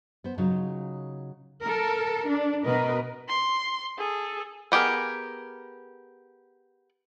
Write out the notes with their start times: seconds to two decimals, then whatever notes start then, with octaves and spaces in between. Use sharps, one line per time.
0.24 B3 C5
0.38 C#3 F#3 D#4 F4 C#5
1.62 A4 A#4
2.26 D4
2.64 B2 A#4 B4 D#5
3.29 C6
3.98 G#4 A4
4.72 B3 G4 G#4 A#4